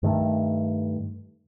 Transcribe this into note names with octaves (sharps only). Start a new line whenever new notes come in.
G2 D#3 A3